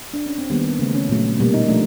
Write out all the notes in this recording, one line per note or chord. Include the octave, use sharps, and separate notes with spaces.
D4
C#4
C4
D#3 G3 A#3 B3
B3
C#3 E3 A3 C4
C#4
A#2 F#3 A3
B2 G3 A#3
D#4
F3 A3 D4